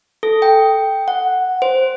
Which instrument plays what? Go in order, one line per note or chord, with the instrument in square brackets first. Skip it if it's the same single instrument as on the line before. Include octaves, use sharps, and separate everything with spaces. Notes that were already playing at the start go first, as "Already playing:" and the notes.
[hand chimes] A4
G5
F#5
C5